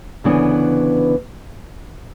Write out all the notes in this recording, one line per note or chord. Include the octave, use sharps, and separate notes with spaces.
D2 C#3 E3 B3 D4